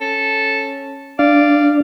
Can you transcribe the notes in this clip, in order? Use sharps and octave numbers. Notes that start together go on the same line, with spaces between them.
C#4 A4
D4 D5 F5